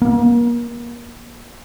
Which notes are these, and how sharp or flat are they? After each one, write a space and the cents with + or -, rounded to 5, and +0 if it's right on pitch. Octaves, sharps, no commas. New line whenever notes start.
A#3 +35